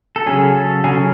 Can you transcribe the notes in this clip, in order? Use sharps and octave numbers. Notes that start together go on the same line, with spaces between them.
A4
C#3 F#3 C#4 G#4
A4
C#3 F#3 C#4 G#4